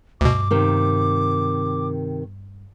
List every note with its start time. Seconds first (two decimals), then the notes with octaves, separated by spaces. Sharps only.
0.21 D2 G2 B2 D6
0.51 C3 D#3 A#3